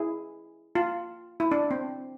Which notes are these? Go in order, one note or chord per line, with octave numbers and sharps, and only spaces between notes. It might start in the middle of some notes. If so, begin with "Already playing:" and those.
Already playing: E4 G#4
F4
E4
D4
C4